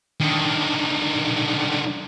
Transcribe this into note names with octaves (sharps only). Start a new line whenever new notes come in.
D3 D#3